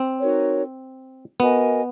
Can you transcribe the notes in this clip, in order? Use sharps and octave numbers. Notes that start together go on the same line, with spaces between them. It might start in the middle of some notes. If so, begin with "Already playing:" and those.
Already playing: C4
D#4 F#4 A#4 C#5
B3 F#4 A#4 D#5 G#5